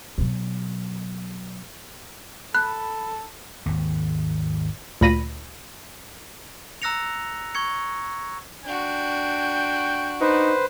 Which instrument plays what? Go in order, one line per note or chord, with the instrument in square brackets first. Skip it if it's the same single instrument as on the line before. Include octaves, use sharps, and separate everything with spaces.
[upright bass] B2 F#3
[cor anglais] A4 [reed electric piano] B5 [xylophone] F#6
[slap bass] G#1 D#2
[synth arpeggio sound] D2 A#2 B5 A#6 D#7
[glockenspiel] A#5 E6 F#6 A#6 C#7 F7
C#6 G#6 C#7
[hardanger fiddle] D4 F#4 [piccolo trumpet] G5
[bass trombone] D#4 [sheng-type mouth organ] B4 C5